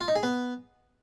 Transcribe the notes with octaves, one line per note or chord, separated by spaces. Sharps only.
F4
D#4
G#4
B3